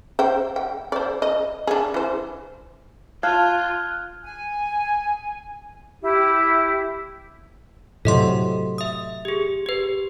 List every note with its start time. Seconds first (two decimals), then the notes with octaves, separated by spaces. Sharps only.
0.19 C5 G5
0.56 G5
0.92 C5 D5
1.22 D#5
1.67 D4 G#4
1.94 E3 C5
3.23 F4 F5 A5 F6 F#6 G#6
4.22 G#5
6.02 E4 G4
8.05 A2 C3 F#3 A4 D#5 C6
8.78 E5 D#6
9.25 G4 G#4
9.66 G4 B4